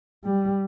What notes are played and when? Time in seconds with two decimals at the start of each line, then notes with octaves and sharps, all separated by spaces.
0.24 G3